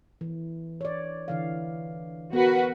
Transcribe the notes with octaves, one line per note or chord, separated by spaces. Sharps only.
E3
C#5 D5
D3 E3 F5
B3 F#4 A#4 B4